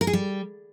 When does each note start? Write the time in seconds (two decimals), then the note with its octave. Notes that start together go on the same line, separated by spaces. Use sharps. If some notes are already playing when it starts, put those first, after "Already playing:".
0.01 A#4
0.07 G#4
0.13 G3